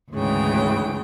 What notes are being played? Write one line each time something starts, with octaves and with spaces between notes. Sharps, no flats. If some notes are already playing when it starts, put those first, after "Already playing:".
D2 G#2 C#3 E3 G5